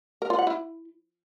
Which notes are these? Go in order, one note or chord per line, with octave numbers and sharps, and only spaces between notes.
A#4
F4
F#5
E4